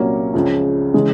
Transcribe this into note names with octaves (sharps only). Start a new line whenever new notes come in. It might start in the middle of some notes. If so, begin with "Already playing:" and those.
Already playing: C2 A#2 F#3 A#3 C#4
C#2 C#3 F3
C#3 E3 G#3